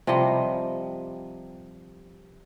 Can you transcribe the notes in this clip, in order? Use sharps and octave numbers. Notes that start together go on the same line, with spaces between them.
C3 F3 G3 D#5